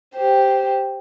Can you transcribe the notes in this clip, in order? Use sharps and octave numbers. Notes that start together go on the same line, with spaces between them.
G4 C5